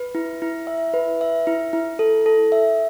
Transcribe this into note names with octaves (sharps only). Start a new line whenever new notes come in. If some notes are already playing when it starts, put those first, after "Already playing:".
Already playing: B4
E4
E4
E5
B4
E5
E4
E4
A4
A4
E5